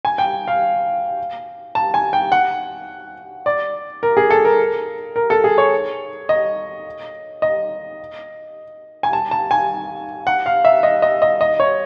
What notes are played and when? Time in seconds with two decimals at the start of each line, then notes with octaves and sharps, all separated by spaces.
0.05 G#5
0.18 G5
0.48 F5
1.75 A5
1.94 G#5
2.13 G5
2.32 F#5
3.46 D5
4.03 A#4
4.17 G#4
4.30 A4
4.45 A#4
5.16 A#4
5.30 A4
5.44 G#4
5.58 C#5
6.29 D#5
7.42 D#5
9.03 G#5
9.13 A5
9.31 A5
9.51 G#5
10.27 F#5
10.46 F5
10.65 E5
10.83 D#5
11.02 D#5
11.22 D#5
11.41 D#5
11.60 C#5